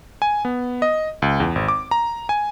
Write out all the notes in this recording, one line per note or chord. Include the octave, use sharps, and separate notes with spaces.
G#5
B3
D#5
C#2
E2
G#1
D6
A#5
G#5